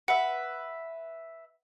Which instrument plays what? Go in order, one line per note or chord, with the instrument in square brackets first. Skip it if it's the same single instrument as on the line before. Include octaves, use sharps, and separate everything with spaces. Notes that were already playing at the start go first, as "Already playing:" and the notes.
[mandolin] B4 E5 [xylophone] F#5